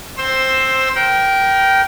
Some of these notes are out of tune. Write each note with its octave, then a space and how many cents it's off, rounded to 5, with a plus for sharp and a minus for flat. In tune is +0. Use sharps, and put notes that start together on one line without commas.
C4 +0 C5 +10 E6 +0
A#4 +20 G5 -15